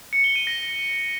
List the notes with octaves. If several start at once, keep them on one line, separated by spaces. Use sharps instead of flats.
C#7
G7
D#7
A#6